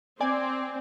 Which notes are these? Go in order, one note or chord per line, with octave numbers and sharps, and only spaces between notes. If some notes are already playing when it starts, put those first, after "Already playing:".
C4 D5 G#5